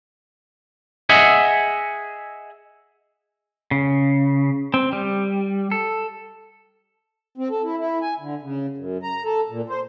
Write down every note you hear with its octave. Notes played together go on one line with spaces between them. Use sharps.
G#4 D#5 E5 F#5
C#3
C4
G3
A4
C4
A4
E4
E4
G#5
D3
C#3
F#2
A#5
A4
A#2
C5